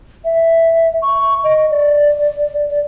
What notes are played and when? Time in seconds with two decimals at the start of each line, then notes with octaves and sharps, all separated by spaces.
0.25 E5
1.02 C#6
1.44 D#5
1.71 D5
2.70 D5